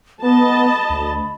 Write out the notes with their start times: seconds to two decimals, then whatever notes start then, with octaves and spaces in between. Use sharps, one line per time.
0.22 B3 D#5 A5 B5
0.90 D2